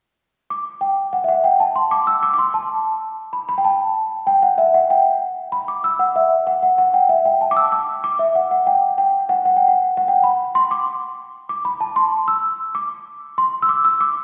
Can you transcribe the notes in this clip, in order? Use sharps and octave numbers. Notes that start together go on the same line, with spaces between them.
D6
G5
F#5
E5
F#5
G5
A5
C6
D6
E6
D6
D6
C6
A5
B5
B5
G5
A5
G5
F#5
E5
F#5
G5
B5
D6
E6
F#5
E5
F#5
F#5
F#5
G5
E5
G5
A5
D6
E6
D6
D6
E5
F#5
F#5
G5
G5
F#5
F#5
G5
F#5
F#5
G5
B5
C6
D6
D6
B5
A5
C6
E6
D6
C6
E6
D6
E6
D6